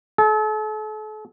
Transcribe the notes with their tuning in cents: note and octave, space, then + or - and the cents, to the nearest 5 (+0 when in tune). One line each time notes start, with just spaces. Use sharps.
A4 -40